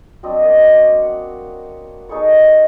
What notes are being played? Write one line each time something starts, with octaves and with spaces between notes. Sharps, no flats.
F#3 C4 D4 D#5
A#3 D4 D#5
F#5
D#4 G#4 A4 C#5